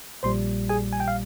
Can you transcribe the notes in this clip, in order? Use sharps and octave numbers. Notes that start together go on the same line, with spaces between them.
A#1 A#2 G3 C5 C6
G#4 G#5
G#5
G5
F5